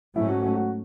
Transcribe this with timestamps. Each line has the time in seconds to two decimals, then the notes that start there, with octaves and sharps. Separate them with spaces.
0.16 G#2 F#3 A3 C#4 E4
0.28 F#4
0.42 F#4
0.55 F#4